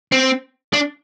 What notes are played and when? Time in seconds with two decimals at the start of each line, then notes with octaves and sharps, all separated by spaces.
0.12 C4
0.74 D4